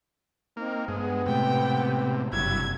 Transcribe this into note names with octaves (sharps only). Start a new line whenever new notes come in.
A#3 C4 D#4
G2 G#3 B3
A2 C3 G#3 A3 G5
F#1 G2 C3 F#3 E4 G#6